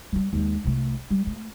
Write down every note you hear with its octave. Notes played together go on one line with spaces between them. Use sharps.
G3 B3
D#2 G#3
C2 A3
G3
A3